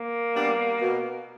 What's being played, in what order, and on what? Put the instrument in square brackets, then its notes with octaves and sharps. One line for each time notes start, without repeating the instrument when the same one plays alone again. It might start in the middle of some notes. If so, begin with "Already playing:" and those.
Already playing: [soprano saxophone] A#3
[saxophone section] G3 B3 D4
B2